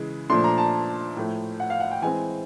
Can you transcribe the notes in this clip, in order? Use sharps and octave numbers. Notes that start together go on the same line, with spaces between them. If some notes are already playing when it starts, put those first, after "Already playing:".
Already playing: C#3 E3 G#3
A#2 F3 A3 D4 C6
A#5
A5
A2 F3 A3
F#5
F5
F#5
G5
E3 G#3 C4 G#5